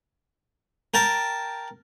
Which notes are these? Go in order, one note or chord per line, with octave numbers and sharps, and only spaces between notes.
A#4 G5 A5